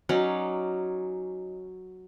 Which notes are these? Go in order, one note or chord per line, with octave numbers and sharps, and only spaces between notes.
F#3 C#4 D#4 D5